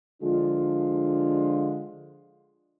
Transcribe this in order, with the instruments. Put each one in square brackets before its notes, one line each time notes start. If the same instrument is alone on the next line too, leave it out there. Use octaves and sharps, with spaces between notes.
[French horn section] D3 F3 G#3 D4 F4